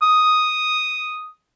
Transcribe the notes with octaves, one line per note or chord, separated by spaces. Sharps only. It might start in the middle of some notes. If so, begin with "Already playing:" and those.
D#6